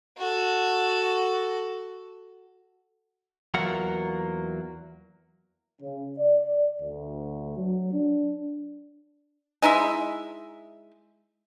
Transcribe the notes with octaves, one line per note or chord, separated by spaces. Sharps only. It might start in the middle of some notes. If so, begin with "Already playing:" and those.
F#4 A4
E2 F#3 A#3 F4 A#4 F#5
C#3
D5
D2
F#3
D4
G#3 D#4 E4 E5